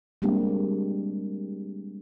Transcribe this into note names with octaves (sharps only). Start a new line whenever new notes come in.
G3 G#3 A#3 C4 D4 G4